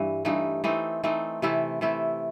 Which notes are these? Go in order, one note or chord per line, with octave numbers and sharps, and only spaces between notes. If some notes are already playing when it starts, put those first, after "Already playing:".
Already playing: G2 E3
G2 E3 A3 D#4
E3 A3 C4 D#4
E3 A3 C4 D#4
C3 E3 A3 E4
C3 E3 A3 E4